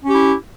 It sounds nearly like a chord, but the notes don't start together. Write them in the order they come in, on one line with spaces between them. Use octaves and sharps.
C#4 G4 E4